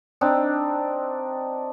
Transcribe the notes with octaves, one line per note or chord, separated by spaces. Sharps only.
C4 D4 D#4